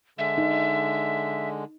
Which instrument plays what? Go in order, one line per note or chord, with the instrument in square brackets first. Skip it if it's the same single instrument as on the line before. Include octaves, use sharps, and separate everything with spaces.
[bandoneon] D3 G#3 [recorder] E5
[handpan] D#4